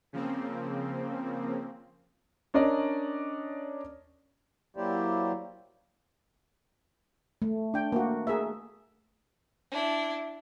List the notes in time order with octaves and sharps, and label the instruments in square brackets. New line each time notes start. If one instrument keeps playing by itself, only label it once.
[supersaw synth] C#3 F3 A#3 C4
[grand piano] C#4 D4 A#4 D5 D#5
[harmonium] F#3 A#3 E4 G4 C5 D5
[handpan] A3
[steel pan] D4 G5
A#3 F#4
G#4 A#4 E5
[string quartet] D4 E4